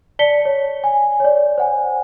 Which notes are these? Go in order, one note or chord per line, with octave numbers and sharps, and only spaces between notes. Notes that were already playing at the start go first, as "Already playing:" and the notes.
D5 A5 B6 C#7 G7
C#5
G#5
C#5 D5
C5 F#5 G#5